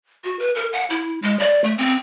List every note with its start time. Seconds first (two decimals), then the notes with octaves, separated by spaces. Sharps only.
0.24 F#4
0.39 B4
0.55 A#4
0.73 F#5
0.90 E4
1.22 G#3
1.39 D5
1.64 A3
1.78 C4